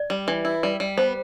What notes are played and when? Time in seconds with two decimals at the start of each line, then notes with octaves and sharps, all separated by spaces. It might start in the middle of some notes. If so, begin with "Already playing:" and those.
Already playing: D5
0.10 G3
0.28 E3
0.45 E4
0.63 G3
0.80 G3
0.98 B3 C5